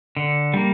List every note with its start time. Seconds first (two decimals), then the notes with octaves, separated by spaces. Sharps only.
0.17 D3
0.54 G3 A#3